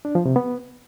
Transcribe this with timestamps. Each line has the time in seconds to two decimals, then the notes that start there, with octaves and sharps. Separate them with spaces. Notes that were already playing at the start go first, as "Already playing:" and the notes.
0.05 D4
0.15 F3
0.26 C3
0.36 B3